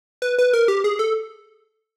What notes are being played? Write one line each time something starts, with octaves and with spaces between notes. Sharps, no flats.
B4
B4
A#4
G4
G#4
A4